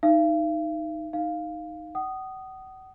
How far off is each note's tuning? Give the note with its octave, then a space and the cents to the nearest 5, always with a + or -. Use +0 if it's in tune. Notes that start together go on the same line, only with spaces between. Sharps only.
D#4 +0 F5 -45
D#4 +0 F5 +0
F#5 +40 D#6 -5